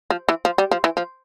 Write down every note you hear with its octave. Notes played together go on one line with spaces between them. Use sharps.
F3
E3
F3
G3
F3
E3
F3